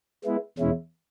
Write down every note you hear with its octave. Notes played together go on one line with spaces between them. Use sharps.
G#3 B3 E4
E2 B2 G#3 C#4 E4